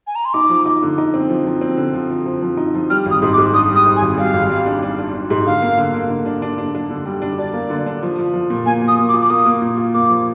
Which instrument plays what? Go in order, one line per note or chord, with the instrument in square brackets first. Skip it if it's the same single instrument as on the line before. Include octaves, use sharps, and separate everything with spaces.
[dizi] G#5
A#5
C6
[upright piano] D#4 [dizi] D6
[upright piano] F3
D#4
D3
D#4
C4
F3
F3
C4
D3
F3
F3
F3
F3
D#4
F3
[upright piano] G3 [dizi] F6
[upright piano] G#1
[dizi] D#6
[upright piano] G#2
[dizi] D6
[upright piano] G#2
[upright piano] D4 [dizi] D#6
[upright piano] G3
[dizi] D#6
[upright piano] G#2
[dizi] G#5
[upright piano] G#1
[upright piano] G3 [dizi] F5
[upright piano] G#1
G3
D4
D4
D4
D4
G#2
[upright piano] D3 [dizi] F5
[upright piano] A#3
D3
A#3
D3
D4
D4
D4
D4
D3
G3
D4
[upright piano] D4 [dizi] D5
[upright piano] A#3
D3
D4
F3
F3
F3
A#2
[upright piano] A#3 [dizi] G#5
[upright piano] A#3
[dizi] D#6
[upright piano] A#3
[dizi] D6
[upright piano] F4
[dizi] D6
[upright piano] A#3 [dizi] D#6
[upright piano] A#3
A#2
F4
[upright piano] A#3 [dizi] D6
[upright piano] F3